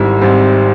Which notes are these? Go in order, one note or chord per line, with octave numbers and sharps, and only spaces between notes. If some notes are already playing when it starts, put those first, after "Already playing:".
Already playing: G#1 G#2 G3 C4 E4
G#1 G#2 G3 C4